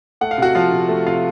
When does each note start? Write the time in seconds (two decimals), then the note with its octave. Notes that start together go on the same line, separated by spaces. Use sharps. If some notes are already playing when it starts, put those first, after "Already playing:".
0.21 A3 F#5
0.31 F5
0.38 C3 F#4 F#5
0.55 F3 F4 F5
0.72 C3
0.89 A3
1.07 C3 F4 F5